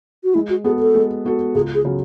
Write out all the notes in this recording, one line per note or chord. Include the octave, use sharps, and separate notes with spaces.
F#4
G#3 E4
F#4
B3 F#4 G#4 A4
A4
G#3
B3 F#4 A4
C#2 G#4
G#4
C#3 F#3